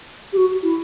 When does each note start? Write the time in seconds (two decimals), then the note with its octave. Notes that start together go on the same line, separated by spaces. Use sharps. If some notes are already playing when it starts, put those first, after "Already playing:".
0.33 G4
0.37 F#4
0.63 E4